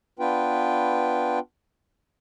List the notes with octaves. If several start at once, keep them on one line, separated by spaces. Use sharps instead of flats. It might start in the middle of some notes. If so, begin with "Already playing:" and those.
B3 D4 F4 B4 G5